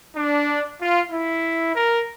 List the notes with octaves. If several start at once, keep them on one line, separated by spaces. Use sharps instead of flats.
D4
F4
E4
A#4